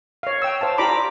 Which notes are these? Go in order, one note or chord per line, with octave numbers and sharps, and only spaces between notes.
C#5 F5
G5 E6
C5 F5 A5
F4 G4 D5 A#5 B5 D6